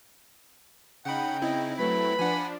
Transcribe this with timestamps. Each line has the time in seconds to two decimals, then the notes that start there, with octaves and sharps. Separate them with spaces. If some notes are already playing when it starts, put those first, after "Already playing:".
1.05 C#3 D#4 F#5 G5 B5
1.42 C4 E4 D#5
1.78 F#3 A3 B4 B5
2.19 F3 D4 F#5 G#5